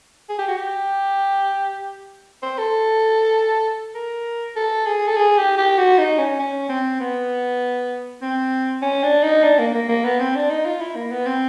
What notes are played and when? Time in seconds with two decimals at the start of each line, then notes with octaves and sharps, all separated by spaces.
0.29 G#4
0.39 G4
0.48 F#4
0.57 G4
2.43 C5
2.58 A4
3.95 A#4
4.56 A4
4.87 G#4
5.07 A4
5.16 G#4
5.38 G4
5.58 G4
5.78 F#4
5.98 D#4
6.18 C#4
6.39 C#4
6.69 C4
7.00 B3
8.22 C4
8.82 C#4
9.03 D4
9.23 D#4
9.43 D4
9.59 A#3
9.75 A#3
9.89 A#3
10.04 B3
10.19 C4
10.35 D4
10.50 D#4
10.65 F4
10.81 E4
10.96 A#3
11.12 B3
11.26 C4